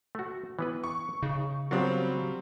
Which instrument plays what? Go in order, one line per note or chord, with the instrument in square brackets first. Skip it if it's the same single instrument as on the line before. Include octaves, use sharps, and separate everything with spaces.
[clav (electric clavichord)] A3 F#4
E3 B3 B4
[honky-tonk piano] C#6
[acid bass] C#3 [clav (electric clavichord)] D#4
[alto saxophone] F#3 [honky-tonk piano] G3 C4 F4 [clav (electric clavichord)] B3 D4 A#4